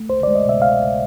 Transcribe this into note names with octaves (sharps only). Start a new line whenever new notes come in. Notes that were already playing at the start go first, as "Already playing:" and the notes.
Already playing: A3
C2 C5
G#3 D5
D#5
B2 E5
C2 F5
C2